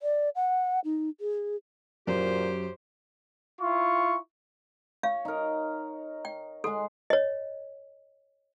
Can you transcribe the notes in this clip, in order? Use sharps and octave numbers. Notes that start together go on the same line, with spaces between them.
D5
F#5
D#4
G#4
F#2 A#2 G4 C5
E4 F4 C#6
C#5 F5
D#4 A#4
G5
G#3 A4 F#5 C6
C#5 D#5